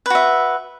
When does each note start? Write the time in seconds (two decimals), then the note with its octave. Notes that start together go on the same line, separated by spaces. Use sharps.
0.06 B4
0.10 F#4
0.15 E5